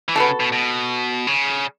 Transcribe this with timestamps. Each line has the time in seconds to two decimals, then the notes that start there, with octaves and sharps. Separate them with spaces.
0.08 E3
0.16 C#3 B3 F#4 A4
0.40 B2
0.52 B2
1.27 C#3